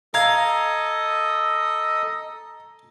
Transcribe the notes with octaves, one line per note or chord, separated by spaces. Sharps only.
A4 D#5 F5 A#5 D#6 G#6